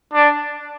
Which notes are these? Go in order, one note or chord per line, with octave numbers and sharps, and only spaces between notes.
D4